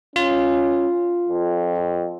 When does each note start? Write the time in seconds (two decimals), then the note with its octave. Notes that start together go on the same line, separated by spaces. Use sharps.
0.16 C#4 F4
1.28 F2